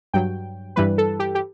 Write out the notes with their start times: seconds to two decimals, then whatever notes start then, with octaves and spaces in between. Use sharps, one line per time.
0.14 G2 F#3 G5
0.76 G2 E3 G3 B4
0.98 A4
1.20 G4
1.35 G4